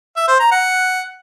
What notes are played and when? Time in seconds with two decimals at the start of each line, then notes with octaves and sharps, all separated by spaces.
0.16 E5
0.28 C5
0.40 A#5
0.51 F#5